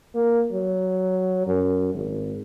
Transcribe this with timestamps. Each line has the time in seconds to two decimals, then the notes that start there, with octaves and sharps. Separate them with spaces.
0.15 A#3
0.52 F#3
1.47 F#2
1.94 G#1